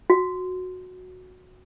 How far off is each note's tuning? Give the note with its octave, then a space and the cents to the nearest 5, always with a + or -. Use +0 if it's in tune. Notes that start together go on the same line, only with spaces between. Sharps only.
F#4 -10